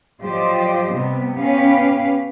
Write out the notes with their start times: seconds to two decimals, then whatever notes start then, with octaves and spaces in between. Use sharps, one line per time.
0.23 F3 F#3 G4 C5 D5 D#5
0.94 C3 G3 B3
1.35 B3 C#4 G4 B4 F5